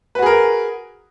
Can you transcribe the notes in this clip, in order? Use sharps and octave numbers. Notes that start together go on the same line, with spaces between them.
F#4 G#4 A#4 B4